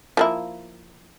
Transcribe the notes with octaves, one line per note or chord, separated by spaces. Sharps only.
F3 A#3 E4